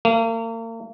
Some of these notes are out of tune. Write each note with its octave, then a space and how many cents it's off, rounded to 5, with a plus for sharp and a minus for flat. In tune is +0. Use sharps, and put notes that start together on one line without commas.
A#3 -40